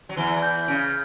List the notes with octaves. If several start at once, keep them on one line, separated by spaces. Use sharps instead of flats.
F#3
E2 E3 G7
G6
C#3 D7